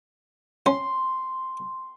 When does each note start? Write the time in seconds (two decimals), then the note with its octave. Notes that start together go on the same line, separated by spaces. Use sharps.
0.66 C#4 C6